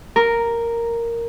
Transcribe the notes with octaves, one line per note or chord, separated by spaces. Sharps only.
A#4